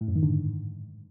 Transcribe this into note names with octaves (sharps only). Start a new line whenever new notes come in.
A2
F#2
D#3
D3
G#2